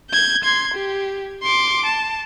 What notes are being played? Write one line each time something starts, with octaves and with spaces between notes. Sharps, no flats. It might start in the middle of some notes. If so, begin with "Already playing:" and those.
G6 G#6
C6 G#6
G4
C6 D6
A5